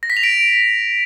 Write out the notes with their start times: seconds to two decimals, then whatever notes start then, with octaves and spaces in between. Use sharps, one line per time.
0.03 A#6
0.10 B6
0.17 F7
0.23 D7